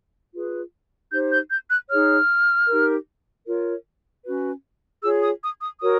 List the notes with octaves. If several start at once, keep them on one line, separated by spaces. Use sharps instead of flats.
F4 G#4 B4
D#4 G4 C5 G6
G6
G6
F#6
D#4 G#4 C#5 F6
D#4 G4 A#4
F4 A#4 C#5
C#4 F#4 B4
F4 G#4 C#5 E6
D#6
D#6
D#6
F#4 A#4 C#5 D#6